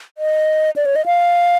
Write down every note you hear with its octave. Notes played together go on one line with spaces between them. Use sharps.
D#5
D5
C#5
D#5
F5